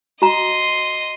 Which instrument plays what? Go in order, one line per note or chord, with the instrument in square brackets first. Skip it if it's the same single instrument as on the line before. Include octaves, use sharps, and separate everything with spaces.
[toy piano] F#4 A#5 [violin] D#5 C6